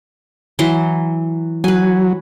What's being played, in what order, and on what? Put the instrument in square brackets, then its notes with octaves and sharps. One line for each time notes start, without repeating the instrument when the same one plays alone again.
[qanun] E3 F#3 C6
[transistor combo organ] F#3 [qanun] B4 G#5